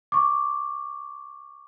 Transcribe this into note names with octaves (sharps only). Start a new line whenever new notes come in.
C#6 D6